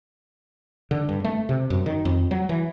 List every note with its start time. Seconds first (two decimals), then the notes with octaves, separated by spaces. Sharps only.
0.91 D3
1.09 G2
1.24 A3
1.49 C3
1.70 F#2
1.86 D#3
2.05 F2
2.31 F#3
2.49 E3